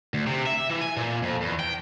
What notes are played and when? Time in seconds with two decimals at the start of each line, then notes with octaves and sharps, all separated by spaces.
0.14 D2
0.27 C3
0.46 E5
0.70 E3
0.81 G#5
0.97 A#2
1.23 F2
1.42 E2
1.60 G5